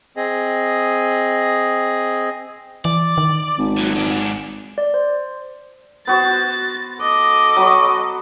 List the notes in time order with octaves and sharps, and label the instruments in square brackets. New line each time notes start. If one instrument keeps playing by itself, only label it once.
[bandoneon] C4 G#4 D#5
[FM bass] E3 [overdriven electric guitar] D5
[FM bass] D#3
[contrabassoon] G#1
[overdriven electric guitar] A#2 F#3
G#2 D4
[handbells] D5
C5
[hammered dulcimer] B3 F#4 C5 [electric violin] A6
[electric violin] A4 D#5 [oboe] D6
[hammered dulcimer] F#3 B5 C#6